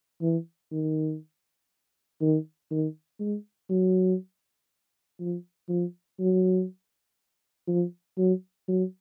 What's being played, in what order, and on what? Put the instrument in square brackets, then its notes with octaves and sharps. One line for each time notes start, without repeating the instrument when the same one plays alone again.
[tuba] E3
D#3
D#3
D#3
G#3
F#3
F3
F3
F#3
F3
F#3
F#3